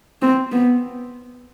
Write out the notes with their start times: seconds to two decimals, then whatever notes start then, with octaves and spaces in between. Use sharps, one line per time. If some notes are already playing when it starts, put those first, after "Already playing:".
0.22 C4
0.52 B3